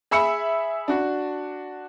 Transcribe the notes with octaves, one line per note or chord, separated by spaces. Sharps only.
G#4 E5 B5 E6 C#7
D4 F#4